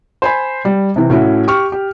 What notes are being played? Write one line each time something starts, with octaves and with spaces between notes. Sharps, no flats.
C5 G#5 B5
G3
C3 E3
A2 C#4 E4 F#4
G4 C#6 F6
G4